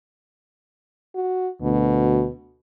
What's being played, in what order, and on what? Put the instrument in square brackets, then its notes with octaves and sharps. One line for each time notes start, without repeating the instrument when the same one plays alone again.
[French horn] F#4
[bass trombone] D2 [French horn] B2